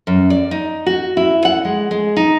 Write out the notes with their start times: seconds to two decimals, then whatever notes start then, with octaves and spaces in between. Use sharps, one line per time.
0.07 F#2
0.30 D5
0.51 D#4
0.86 F#4
1.17 E4
1.45 F#5
1.65 G#3
1.91 G#3
2.17 D#4